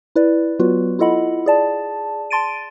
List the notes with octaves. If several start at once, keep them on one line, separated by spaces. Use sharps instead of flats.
E4 B4 D5
F#3 B3 F4 F#4 B4
E4 F4 A4 D#5 F#5 B5
G#4 D5 A5
A5 C6 A6 D7 D#7